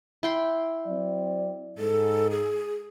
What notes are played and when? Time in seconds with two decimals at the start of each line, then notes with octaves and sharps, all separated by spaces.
0.23 E4 G5 C6
0.87 F#3 C4 D5
1.78 G#2 A4
2.31 G#4